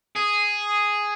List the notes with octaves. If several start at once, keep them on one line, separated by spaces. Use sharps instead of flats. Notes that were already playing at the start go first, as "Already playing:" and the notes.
G#4